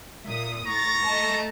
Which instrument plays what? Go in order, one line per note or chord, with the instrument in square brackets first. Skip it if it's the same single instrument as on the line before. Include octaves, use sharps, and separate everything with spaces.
[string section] A#2 D#6 [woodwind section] E5
[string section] A2 A6 [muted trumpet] A#5 [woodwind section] C#6
[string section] A3 D#5 A5